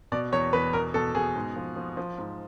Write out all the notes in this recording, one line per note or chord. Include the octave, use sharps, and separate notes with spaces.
B2 D5
E2 C#5
E2 B4
B2 A#4
B2 A4
B2 G#4
G#2
F3
F3
F3
G#2